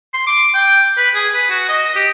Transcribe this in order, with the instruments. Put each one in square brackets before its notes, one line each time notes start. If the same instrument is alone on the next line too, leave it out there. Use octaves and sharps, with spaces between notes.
[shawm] C6
D6
G5
B4
G#4
B4
F#4
D#5
G4